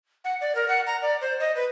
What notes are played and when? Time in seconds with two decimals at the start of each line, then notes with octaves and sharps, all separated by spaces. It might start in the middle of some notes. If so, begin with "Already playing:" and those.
0.24 F#5
0.41 D5
0.55 A#4
0.68 F#5
0.86 A#5
1.02 D5
1.21 C5
1.40 D#5
1.56 B4